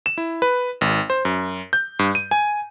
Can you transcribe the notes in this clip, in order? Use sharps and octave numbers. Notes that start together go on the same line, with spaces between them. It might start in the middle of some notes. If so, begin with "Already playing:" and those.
E7
E4
B4
G#1
C5
F#2
G6
G2
D#7
G#5